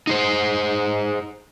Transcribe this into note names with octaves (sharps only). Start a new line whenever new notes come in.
D#4 G#4 C5